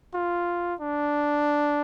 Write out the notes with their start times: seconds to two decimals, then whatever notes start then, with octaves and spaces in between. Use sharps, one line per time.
0.14 F4
0.80 D4